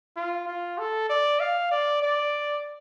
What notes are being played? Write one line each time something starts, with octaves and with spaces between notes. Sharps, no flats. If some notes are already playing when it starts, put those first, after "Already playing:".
F4
F4
A4
D5
F5
D5
D5